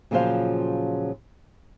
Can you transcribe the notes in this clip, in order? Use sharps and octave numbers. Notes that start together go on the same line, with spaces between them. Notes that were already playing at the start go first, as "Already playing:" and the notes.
A#2 C#3 F3 F#3 C5 F5